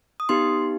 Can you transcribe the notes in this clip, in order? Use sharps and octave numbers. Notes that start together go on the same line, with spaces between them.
D#6
B3 D#4 G4 C6